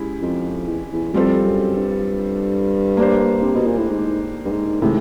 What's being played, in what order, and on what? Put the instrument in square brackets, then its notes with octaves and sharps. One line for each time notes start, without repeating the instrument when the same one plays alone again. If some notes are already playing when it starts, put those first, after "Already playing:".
Already playing: [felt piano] G#3 C#4 E4 G4
[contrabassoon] F2
E2
E2
[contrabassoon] F2 [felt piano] G3 C4 F4 A4 C5
[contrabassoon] F#2
G2
[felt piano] A#3 D4 G4 C5
[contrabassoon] C3
B2
A#2
A2
G#2
G2
G#2
[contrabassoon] A2 [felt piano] C3 D#3 G#3 C4